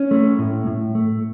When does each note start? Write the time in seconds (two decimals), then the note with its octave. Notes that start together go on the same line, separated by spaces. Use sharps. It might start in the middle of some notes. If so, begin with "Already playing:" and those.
Already playing: C#4
0.11 A3
0.39 A2
0.67 A2
0.95 A3